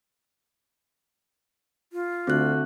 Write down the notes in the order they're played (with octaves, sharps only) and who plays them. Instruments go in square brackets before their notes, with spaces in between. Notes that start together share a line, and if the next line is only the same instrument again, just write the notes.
[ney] F4
[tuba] D2 [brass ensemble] D3 A3 F#4 [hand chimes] C4 F#6